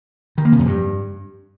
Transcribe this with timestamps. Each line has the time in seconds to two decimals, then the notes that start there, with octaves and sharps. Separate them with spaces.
0.38 D#3
0.45 A#3
0.52 C3
0.59 F2
0.66 G2